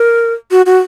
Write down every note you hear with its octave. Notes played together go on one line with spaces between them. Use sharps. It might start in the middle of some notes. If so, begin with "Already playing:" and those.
Already playing: A#4
F#4
F#4